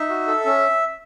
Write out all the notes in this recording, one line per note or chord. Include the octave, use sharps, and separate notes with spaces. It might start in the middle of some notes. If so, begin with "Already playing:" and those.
Already playing: D#4 E5
F#4
A4
C#4